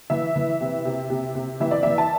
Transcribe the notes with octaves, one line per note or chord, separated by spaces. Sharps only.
E3 E5
E3
C3
C3
C3
C3
E3 E5
D5
E3 E5
A5